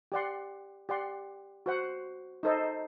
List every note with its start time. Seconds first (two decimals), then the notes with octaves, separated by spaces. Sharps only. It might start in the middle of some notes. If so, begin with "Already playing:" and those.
0.12 G4 D5 F#5 C6
0.89 G4 D5 F#5 C6
1.66 F#4 C5 F#5
2.43 D#4 A4 C5 D#5